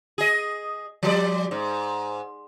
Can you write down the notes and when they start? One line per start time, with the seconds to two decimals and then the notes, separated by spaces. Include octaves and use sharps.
0.18 G#4 D#5
1.03 F3 G3 D5
1.51 G#2